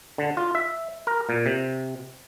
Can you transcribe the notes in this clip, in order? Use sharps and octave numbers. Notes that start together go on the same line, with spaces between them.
D3
F4
E5
A#4
A#2
C3